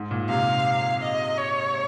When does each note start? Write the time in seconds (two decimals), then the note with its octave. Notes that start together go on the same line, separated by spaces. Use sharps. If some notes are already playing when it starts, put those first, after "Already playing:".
Already playing: G#2
0.11 A#2
0.29 C3 F5
1.02 D#5
1.38 C#5